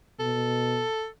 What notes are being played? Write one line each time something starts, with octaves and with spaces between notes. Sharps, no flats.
B2 A4